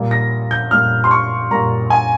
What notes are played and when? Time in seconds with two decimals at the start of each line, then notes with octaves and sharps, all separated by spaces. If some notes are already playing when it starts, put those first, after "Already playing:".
Already playing: A#2 G3 A#3
0.11 A#6
0.51 G6
0.71 A#2 G3 A#3 F6
1.04 C6
1.11 C#6
1.51 A#2 G3 A#3 A#5
1.90 G#5